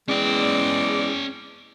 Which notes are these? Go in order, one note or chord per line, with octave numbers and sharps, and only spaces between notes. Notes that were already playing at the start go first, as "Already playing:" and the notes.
E2 G#3 C#4 D5 G5